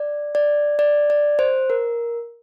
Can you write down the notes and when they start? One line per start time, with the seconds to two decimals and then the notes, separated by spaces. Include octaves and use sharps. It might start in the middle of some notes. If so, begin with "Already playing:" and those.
Already playing: D5
0.35 D5
0.79 D5
1.10 D5
1.39 C5
1.70 A#4